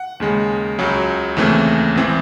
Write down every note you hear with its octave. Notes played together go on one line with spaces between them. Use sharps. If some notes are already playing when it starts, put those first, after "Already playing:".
Already playing: F#5
D#2 C#3 G#3
C#2 C#3 F#3
D#2 C#3 E3 A3 C4
G#1 E3 C4